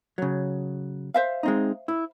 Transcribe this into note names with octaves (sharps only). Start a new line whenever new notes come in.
C#3 F#3
C5 E5 F5
G#3 C4 D#4
E4